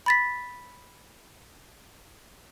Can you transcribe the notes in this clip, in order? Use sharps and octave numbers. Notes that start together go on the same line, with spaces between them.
B5 A6 B6